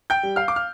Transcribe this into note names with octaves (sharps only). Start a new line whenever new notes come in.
G5 G6
G3
F5 F6
D6
F6